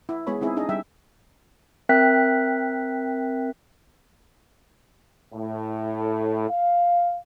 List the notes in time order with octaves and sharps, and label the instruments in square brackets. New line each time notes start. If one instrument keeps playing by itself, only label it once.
[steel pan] E4
G#3 B3 G#4 C#5 B5
C4 D#4 E4 G#4
D4 D#4 G#4 D#5
G3 E5 G5
[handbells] C4 A#4 E5 G5 F#6 B6
[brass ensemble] A2
F5